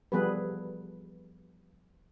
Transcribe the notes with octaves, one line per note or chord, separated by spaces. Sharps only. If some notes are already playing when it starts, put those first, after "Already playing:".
F3 G3 B3 G#4 A4 B4